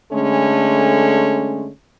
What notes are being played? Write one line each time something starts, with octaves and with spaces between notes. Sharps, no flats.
D3 G#3 A3 C#4